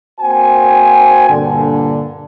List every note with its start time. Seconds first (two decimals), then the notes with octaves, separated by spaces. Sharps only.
0.20 A#3 C4 F#4 C5 G5 G#5
1.29 G2 A#2 D3